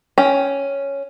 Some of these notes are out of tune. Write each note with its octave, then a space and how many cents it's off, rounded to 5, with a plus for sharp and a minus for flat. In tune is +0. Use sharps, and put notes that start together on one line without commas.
C#4 +0 G5 +0